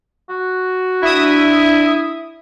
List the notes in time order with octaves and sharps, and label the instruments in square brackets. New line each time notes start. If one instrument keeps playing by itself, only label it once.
[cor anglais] F#4
[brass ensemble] D4 [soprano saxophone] E4 [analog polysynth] E5 D#6